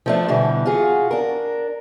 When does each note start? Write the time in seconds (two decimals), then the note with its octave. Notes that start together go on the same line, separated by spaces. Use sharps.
0.06 F3 A3 D4
0.28 B2 D3 E3 G3
0.66 F4 F#4 G#4
1.11 D4 A#4